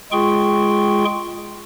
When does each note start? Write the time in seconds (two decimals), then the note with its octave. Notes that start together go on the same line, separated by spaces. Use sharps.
0.12 G#3 F4 G#4 G5 C6 C#6